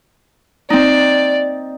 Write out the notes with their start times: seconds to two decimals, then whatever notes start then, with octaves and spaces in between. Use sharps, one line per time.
0.70 C4 D#4 D5